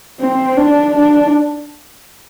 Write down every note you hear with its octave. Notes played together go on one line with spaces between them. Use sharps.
C4
D4
D4